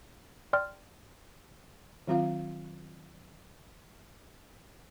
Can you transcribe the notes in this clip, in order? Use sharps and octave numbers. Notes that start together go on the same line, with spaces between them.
D5 G5 C6 F6
D#3 F#3 C4 F4 F5